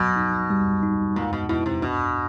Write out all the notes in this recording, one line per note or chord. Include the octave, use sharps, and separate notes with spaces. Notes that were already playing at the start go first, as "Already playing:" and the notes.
Already playing: B2 F#3
D#4
G3
D#4
A#2 G#3
B2
B2 E4
C3
B2 D4